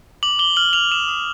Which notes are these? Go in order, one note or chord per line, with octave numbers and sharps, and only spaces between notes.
D6 F#7
D6 G7
F6 F#7
F6 F7
D#6 E7
D#6